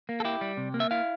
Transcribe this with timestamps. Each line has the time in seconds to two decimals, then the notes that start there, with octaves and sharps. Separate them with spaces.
0.09 A#3
0.20 A4
0.25 E4 G4
0.41 G3
0.57 C3
0.74 A#3
0.80 E5
0.91 E4 F5